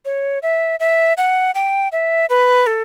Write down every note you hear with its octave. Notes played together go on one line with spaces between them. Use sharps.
C#5
E5
E5
F#5
G5
E5
B4
A4